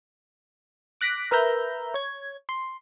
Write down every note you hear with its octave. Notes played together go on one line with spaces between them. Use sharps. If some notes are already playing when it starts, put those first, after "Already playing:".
D6 F#6 A#6 B6 D7
A#4 B4 E5 A#5 G6
C#5 G#6
C6